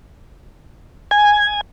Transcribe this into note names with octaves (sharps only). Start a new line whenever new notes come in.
G#5